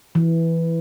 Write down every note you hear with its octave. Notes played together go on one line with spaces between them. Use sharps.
E3